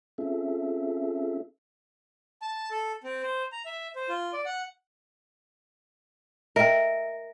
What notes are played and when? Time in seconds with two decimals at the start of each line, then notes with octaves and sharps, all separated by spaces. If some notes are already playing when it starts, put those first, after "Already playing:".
0.18 C4 C#4 F4 G#4 A4 E5
2.42 A5
2.71 A4
3.04 C4
3.23 C5
3.52 A#5
3.66 E5
3.95 C5
4.09 F4
4.33 D5
4.46 F#5
6.56 A#4 D#5 E5 G5